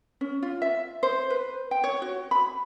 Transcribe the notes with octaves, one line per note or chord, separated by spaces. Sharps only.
C#4
F4
E5
C5
B4
G5
C#5
F#4
B5